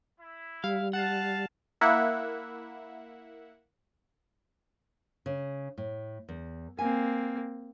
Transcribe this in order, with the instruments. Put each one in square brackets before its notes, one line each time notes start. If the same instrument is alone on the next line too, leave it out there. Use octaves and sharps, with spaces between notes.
[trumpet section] E4
[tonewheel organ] G3 [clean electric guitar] F5
[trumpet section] F5 A5 [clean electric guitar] F#5
[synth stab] A#3 E4 E5 F#5
[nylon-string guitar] C#3
A2
E2
[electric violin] A#3 C4 [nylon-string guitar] G#5